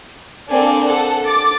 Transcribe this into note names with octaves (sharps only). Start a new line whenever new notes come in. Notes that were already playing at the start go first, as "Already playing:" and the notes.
A#3 C4 D4 A4 D5 G#5
A4 F#5
D6 A6